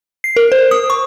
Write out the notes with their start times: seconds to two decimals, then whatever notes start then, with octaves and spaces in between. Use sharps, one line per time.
0.24 C7
0.36 A#4
0.52 C5
0.71 D#6
0.90 C#6